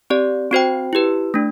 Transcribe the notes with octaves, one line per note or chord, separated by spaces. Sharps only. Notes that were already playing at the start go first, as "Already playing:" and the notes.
C4 G4 D5
C4 F#4 C5 G5
E4 G4 B4
A3 D4